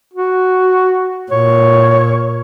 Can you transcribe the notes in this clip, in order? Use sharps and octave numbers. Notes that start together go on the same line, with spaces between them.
F#4
A#2 C#5